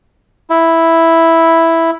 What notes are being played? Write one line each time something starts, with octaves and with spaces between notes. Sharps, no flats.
E4